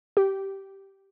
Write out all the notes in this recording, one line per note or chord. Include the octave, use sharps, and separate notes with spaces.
G4